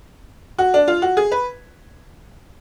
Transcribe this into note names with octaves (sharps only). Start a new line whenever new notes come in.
F#4
D4
F4
F#4
G#4
B4